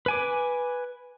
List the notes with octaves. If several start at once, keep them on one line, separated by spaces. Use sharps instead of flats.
B4 G#5 D6